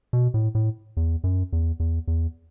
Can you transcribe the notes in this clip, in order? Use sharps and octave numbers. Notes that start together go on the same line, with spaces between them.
B2
A2
A2
E2
F#2
E2
E2
E2